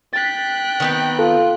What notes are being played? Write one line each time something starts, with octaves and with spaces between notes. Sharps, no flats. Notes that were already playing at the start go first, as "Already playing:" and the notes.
G5 F#6 A6 B6
D#3 B3 C4
F4 A4